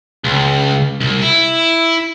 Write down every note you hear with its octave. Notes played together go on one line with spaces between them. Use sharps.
C#2
C2
E4